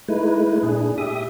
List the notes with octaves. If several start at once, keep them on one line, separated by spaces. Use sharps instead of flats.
G#3 A3 D#4 E4 B4
A#2 D4 G#4
G4 E5 D#6